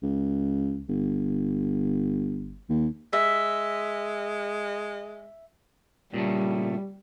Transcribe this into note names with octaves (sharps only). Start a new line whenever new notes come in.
C#2
G1
D#2
G#3 E5
A#2 C#3 G3 A3